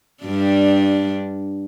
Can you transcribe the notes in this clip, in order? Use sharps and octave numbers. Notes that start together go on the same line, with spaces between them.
G2 D4